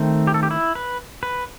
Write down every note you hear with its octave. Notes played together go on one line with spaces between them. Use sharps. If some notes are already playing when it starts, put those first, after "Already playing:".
Already playing: D#3 A3 C4
G4
A4
G4
E4
B4
B4